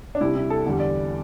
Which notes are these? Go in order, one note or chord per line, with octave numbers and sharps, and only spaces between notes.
D4
C2 C3 G3 E4
E4
A4
E2 D3 G3
D5